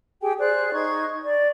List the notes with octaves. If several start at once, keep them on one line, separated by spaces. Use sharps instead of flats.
G4 G#4 G5 G#5
G#4 C5 D5 F#6
D#4 C#6 G#6
D5